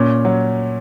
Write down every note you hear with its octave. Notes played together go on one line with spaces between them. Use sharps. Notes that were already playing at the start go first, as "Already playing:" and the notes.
Already playing: A#2 C#4
F#3